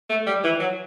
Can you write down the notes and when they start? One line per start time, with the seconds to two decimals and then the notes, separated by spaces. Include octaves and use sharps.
0.10 A3
0.27 G3
0.44 E3
0.60 F#3